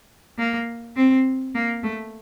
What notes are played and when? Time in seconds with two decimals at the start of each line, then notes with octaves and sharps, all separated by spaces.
0.38 A#3
0.96 C4
1.55 A#3
1.83 A3